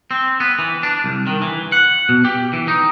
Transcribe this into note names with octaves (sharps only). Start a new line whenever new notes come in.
C4
B3
E3
D4
C2
D#3
E3
F#5
B2
G4
E3
D#4